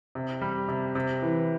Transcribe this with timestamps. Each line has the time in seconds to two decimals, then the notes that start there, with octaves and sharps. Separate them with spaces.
0.15 C3
0.41 G3
0.68 C3
0.95 C3
1.22 E3